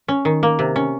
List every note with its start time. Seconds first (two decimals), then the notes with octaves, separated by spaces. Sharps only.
0.08 C#4
0.25 D#3
0.43 A#3
0.59 C3
0.76 C#4